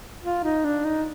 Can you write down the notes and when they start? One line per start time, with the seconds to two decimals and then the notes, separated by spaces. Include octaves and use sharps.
0.23 F4
0.44 D#4
0.64 D4
0.85 D#4